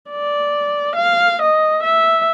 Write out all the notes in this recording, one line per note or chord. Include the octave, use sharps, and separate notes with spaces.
D5
F5
D#5
E5